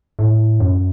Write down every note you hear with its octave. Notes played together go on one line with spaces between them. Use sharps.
A2
F#2